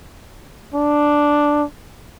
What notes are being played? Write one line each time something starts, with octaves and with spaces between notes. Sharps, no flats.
D4